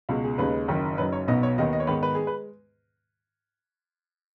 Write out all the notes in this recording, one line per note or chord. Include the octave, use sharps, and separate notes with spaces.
C#2 B2 G#3
G#4
D#2 C#3 G#3 D#4 B4
F#1 F#2 D#3
F#1 F#2 F#3 D#4 B4
C#5
B1 B2 B3 D#4 D#5
C#5
D#2 D#3 B3 D#5
D#5
C#5
G#2 D#3 B3 B4
B4
G#3 G#4
B4